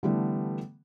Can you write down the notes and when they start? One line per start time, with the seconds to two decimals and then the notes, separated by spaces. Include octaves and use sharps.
0.03 D3 E3 G3 A3 B3